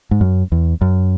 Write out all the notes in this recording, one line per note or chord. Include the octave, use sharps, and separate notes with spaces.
G#2
F#2
E2
F#2